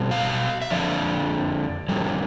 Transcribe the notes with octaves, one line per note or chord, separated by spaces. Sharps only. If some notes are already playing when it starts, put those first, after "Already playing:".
Already playing: B2 G3
F5
E5
F2 D3 F3 D5
F2 D3 G3